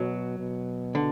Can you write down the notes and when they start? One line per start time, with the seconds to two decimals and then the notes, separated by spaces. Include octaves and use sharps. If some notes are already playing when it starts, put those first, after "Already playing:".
Already playing: B2 F#3
0.39 B2
0.95 D3